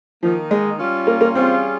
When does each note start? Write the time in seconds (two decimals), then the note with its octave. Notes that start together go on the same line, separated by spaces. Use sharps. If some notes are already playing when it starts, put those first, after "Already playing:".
0.23 D#3 F3 A#3 D#4
0.51 G#3
0.79 G3 C#4 F4
1.07 A#3
1.21 A#3
1.35 G3 C4 C#4 F4 G#4